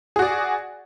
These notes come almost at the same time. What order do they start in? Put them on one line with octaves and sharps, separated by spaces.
G#4 F#4 D5